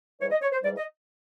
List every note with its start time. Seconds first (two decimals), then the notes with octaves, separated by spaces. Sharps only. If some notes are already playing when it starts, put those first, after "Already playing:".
0.21 G#2 E3 G3 C#5
0.31 D#5
0.42 C#5
0.52 C5
0.63 G#2 E3 G3 D5
0.77 D#5